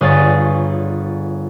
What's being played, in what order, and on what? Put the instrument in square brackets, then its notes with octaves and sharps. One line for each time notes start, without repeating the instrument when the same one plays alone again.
[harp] G1 F4 G#4 C#5 A6